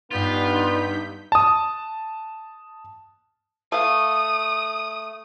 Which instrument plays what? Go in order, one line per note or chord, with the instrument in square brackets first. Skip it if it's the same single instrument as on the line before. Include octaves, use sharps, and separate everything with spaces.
[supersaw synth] G2 G6 B6 [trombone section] G3 B3 [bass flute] D#4 [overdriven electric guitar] F4
[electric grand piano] A5 D#6
[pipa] A3 F5 [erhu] D#6